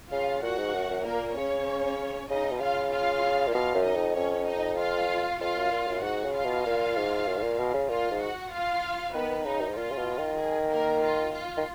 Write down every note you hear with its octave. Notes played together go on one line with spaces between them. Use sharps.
C#3 F4 F5
A#2 F#4 F#5
G#2
F#2
F#2
A#2 A#3 A#4
C#3 C#4 C#5
C#3 D#4 D#5
B2
C#3 F4 F5
F4 F5
A#2
B2 F4 F5
F#2
D#4 D#5
F2
F2 C#4 C#5
D#4 D#5
F4 F5
F2 F4 F5
F#2
A#2
F#2
G#2 F#4 F#5
C#3
F4 F5
B2
A#2
G#2
F#2
G#2
A#2
B2
C#3
A#2 F4 F5
G#2
F#4 F#5
F4 F5
D#3 B3 B4
C#3 D#4
F#2
G#2
A#2 F4
C#3
B2
D#3
G#4
A#3 A#4
F4
F4
D#3